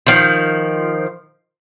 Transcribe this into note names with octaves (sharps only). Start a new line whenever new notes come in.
D#3 F3